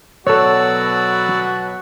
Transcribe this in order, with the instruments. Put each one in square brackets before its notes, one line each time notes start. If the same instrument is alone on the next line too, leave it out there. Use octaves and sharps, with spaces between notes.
[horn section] B2 F#3 [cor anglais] F#4 [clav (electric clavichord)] A4 C#5 [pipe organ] D5 E6